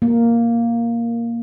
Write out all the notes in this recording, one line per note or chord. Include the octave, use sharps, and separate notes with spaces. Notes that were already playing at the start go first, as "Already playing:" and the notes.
A#3